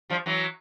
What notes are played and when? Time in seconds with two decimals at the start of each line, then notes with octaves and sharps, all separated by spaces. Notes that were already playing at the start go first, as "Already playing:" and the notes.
0.10 F3 G3
0.26 E3 F#3